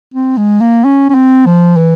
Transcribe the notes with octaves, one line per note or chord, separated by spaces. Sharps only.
C4
G#3
A#3
C#4
C#4
C4
F3
E3